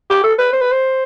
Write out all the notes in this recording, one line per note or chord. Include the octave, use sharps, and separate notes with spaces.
G4
A4
B4
C5
B4
C5